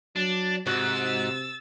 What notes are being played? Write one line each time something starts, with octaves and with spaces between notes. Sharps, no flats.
F#3 D4
G#2 C3 F#4 E6 A6